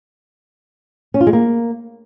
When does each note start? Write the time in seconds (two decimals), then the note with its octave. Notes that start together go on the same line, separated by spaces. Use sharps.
1.14 C#4
1.20 F4
1.27 G#3
1.33 A#3